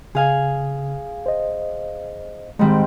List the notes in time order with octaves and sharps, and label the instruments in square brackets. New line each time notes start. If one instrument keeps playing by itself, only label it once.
[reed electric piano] C#3 [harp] G#4 F5 G#5
[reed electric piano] C5 D#5
[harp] G#2 G3 C4 [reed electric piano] D#3 G#3